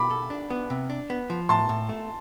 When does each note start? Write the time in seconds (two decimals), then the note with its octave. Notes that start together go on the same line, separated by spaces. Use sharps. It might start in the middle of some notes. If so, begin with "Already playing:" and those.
Already playing: B2 B5 D6
0.10 A4
0.30 D4
0.50 B3
0.70 C3
0.90 D4
1.10 B3
1.30 F3
1.49 A2 A5 C6
1.69 A2
1.89 A3